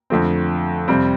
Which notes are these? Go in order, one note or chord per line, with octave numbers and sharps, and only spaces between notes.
F2 D3 F3 A3 C4
F2 C3 G3 C4